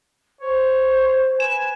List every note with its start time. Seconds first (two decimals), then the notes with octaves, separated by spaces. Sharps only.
0.41 C5 C#5
1.40 B4 G#5 E7